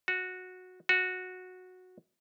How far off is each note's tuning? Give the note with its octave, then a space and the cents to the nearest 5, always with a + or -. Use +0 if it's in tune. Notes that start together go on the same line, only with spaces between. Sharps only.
F#4 -10
F#4 -10